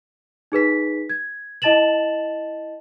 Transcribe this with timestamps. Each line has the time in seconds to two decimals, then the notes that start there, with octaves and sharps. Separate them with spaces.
0.52 D#4 G#4 B4 B6
1.09 G#6
1.62 E4 D#5 A5 A6 E7 F#7